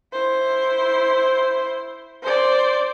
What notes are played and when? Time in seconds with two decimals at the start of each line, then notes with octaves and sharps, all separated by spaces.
0.12 E4 C5
2.23 C5 D5